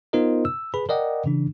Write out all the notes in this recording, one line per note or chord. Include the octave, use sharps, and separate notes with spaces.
B3 D#4 F4 A#4 C5 D#5
E6
G#4 B4 B5
A#4 D5 D#5 F#5 G5
C#3 E3 D4